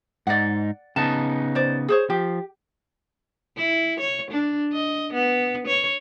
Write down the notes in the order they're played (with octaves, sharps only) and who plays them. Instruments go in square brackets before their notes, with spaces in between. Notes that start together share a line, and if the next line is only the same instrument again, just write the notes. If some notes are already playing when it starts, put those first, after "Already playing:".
[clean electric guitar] G#2 D#4 [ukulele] D5 F#5
[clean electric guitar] C#3 B3 D#4 [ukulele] A5
[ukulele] C5 D5
G#4 C5 C#5
[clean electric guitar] F3 [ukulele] G4
[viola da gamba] E4
C#5
D4
D#5
B3
C#5